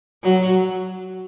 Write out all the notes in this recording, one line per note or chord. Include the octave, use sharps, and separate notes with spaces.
F#3